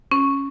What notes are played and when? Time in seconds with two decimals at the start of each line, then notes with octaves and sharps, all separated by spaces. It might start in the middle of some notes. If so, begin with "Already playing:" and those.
0.12 C#4